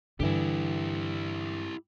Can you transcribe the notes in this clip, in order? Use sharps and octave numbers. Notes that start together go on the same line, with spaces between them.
G2 D3 E3 E4 G4